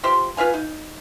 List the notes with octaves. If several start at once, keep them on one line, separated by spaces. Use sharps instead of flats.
F4 G4 C5 C6
F4 B4 F5 G#5
D#4